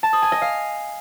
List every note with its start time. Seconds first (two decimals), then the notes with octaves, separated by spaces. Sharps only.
0.03 A5
0.13 D#6
0.22 G#5
0.32 D#5
0.42 F5